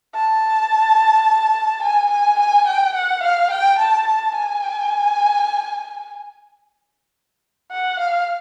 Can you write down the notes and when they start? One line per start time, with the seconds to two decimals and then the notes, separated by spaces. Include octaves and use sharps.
0.15 A5
1.83 G#5
2.11 G#5
2.39 G#5
2.67 G5
2.95 F#5
3.23 F5
3.51 G5
3.79 A5
4.07 A5
4.35 G#5
7.72 F#5
8.00 F5